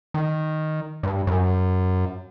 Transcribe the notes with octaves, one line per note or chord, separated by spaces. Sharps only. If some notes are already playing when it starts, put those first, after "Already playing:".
D#3
G2
F#2